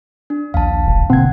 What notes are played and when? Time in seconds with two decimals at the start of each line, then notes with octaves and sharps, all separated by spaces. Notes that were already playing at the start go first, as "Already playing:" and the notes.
0.30 D4
0.54 A#1 D#2 F5 A5
0.87 E1
1.10 B2 D3 A#3 C4 F#5 G#6